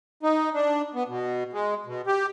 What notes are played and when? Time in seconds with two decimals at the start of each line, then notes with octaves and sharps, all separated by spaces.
0.23 D#4
0.54 D4
0.95 B3
1.08 B2
1.53 G#3
1.86 B2
2.07 G4